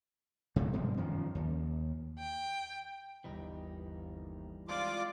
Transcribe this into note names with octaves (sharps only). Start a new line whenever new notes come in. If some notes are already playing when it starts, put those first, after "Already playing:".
C3 F#3 A3
G2 B2 F3 G#3
F#2 D#3 F3
D#2
G5
G1 D#2 E3 G3 D#4
G#3 C4 F4 D5 D6